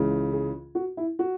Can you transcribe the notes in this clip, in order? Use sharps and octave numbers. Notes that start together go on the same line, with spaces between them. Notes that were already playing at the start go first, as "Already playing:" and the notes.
Already playing: C#2 C#3 E3
G#4
F#4
E4
F#4